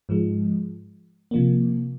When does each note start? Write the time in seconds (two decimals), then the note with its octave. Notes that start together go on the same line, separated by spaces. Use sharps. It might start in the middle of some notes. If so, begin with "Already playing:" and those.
0.09 G#2 F3 G#3
1.31 C3 F3 A#3